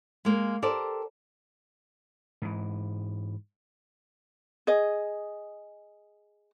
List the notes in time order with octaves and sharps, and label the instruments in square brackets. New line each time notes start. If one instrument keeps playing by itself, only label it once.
[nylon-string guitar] G#3 A#3
G4 A4 A#4 C5 D5
[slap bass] G#2 E3
[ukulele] G#4 D#5